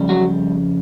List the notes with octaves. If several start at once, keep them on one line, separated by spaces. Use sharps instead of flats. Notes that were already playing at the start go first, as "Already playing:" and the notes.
Already playing: F2 C#3 G3
F#3 F#4